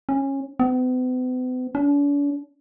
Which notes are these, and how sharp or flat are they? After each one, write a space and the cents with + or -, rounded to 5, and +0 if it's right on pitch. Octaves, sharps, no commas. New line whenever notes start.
C#4 -20
B3 +45
D4 -45